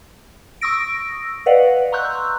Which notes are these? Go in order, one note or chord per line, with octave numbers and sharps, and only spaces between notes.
C#6 D#6 E6 A#6 D7
B4 D5 D#5 F5 F#5
A#5 C6 C#6 E6 F#6 G6